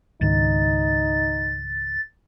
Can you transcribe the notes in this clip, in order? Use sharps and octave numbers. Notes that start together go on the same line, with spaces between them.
C#2 G#2 D#3 D#4 A6